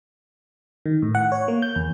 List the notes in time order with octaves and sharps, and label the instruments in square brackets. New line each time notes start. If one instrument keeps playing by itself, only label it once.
[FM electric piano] D#3
A2
F#5
C#5
A#3
G6
E2